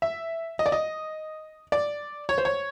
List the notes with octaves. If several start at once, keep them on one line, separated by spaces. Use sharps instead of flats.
E5
D#5
D5
D#5
D5
C#5
C5
C#5